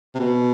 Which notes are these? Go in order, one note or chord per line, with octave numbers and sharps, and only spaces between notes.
C3
B2